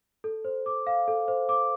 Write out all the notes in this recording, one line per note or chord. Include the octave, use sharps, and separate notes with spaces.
A4
C5
D6
F5
A4
C5
D6